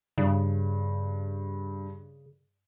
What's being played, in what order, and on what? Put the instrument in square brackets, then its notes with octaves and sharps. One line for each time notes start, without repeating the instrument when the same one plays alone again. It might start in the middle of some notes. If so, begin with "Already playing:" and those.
[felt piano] G2 [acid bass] C#3